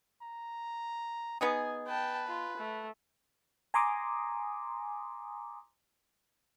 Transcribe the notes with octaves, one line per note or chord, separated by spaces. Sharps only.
A#5
B3 D#4 G#4 G#5
B4 G5 A5
F4
A3
G#5 A#5 C6 D6 D#6